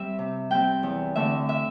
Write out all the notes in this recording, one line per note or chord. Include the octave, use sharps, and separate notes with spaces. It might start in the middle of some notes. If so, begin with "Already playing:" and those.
Already playing: G3 C4 E5
C3
G3 C4 G5
E2
D3 A3 C4 E5
E5